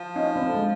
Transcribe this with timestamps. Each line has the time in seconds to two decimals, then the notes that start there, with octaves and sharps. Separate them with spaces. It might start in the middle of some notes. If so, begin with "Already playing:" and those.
Already playing: F3
0.16 C#4 D#4
0.36 C4 D4
0.47 A3
0.54 G#3